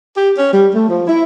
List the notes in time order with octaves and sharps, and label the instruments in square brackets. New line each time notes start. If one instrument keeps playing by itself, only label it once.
[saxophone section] G4
C#4
G3
A3
F3
E4